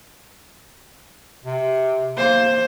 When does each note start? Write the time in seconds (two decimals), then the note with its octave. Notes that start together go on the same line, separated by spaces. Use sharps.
1.44 C3
2.18 A#3 C5